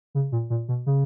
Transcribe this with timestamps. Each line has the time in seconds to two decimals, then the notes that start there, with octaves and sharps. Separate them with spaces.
0.15 C#3
0.32 A#2
0.50 A#2
0.68 B2
0.86 C#3